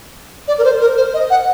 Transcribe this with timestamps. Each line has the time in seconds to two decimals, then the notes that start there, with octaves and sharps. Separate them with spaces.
0.48 D5
0.58 A#4
0.64 C5
0.81 A#4
0.97 C5
1.14 D#5
1.30 F#5